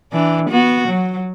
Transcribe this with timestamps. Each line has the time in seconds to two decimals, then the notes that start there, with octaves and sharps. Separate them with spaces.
0.13 E3 D4
0.50 B3 F#4
0.88 F#3